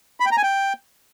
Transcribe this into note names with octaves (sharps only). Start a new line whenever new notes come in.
B5
G5
A#5
G#5
G5